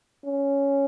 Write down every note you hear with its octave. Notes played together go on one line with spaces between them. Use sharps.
C#4